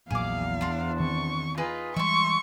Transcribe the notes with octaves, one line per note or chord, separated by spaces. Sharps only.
A#1 E2 A#2 F#3 G#4 F5 D6
D4 C5
D#3 C4 C#6
D#4 F4 G#4 B4
E3 G3 G#3 E5 C6 C#6